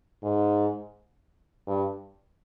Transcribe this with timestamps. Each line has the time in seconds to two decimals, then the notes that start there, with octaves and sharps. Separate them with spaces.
0.23 G#2
1.67 G2